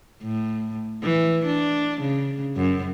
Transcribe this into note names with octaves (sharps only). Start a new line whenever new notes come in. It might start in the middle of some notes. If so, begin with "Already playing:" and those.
A2
E3
D4
C#3
F#2